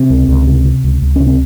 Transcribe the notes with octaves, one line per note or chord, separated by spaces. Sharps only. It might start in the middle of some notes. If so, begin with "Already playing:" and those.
Already playing: C3 C4
C#2
C#2
C3
C3
C#2
C#2
C3 C#4
C4